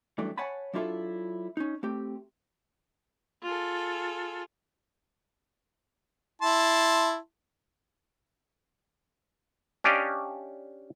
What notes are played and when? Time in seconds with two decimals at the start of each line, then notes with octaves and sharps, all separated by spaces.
0.18 F#2 E3 G3 A3 D4
0.38 C#5 F#5 G#5 A5 B5
0.73 F#3 D4 E4 F4 A4 E5
1.57 C#4 D#4
1.83 A3 C4 G4
3.43 F4 G#4 A4
6.42 E4 A5 C6
9.84 C#4 D4 G4 D5 D#5 F5